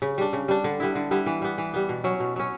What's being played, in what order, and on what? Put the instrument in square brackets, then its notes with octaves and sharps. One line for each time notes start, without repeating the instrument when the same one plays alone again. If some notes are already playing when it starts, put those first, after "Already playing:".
[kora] C#3
G3 D4
C#3
G3 D4
D3
G3 B3 E4
D3
G3 B3 E4
E3
G3 B3
E3
G3 B3
B2
F#3 C#4
B2
F#3 C#4